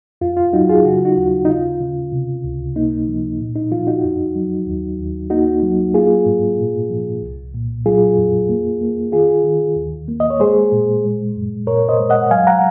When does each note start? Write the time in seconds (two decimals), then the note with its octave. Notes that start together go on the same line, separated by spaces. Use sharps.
0.21 F2 F4
0.37 F4
0.53 F#3 D#4 F#4
0.69 F4 G#4
0.85 C#3 F#4
0.96 F4
1.05 D#4 F#4
1.17 D#2
1.45 D#4
1.48 C#3 F4
1.81 C#3
2.12 C3
2.44 C#2
2.76 A#3 D#4
3.08 F3
3.39 A#2
3.56 D#4
3.72 F3 F4
3.87 D#4 F#4
4.04 F2
4.36 F#3
4.67 D#2
4.99 D#2
5.30 A#3 D#4 F#4
5.63 F#3
5.94 A#3 F4 G#4
6.26 G#2
6.58 A#2
6.90 F3
7.22 C2
7.54 A#2
7.85 F#3 F4 G#4
8.17 F2
8.49 A#3
8.81 A#3
9.12 D#3 F4 G#4
9.44 D#3
9.76 D#2
10.08 A#3
10.20 D#5
10.30 C#5
10.40 G#3 G#4 C5
10.72 A#2
11.04 G#3
11.36 F#2
11.67 A#2 A#4 C#5
11.89 C5 D#5
11.99 G#3
12.10 D#5 F#5
12.31 F#3 F5 G#5
12.47 F#5 A#5